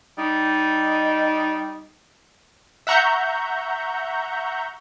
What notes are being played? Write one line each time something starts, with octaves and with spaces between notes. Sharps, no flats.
G3 D#4
E5 F#5 A#5 C#6 G6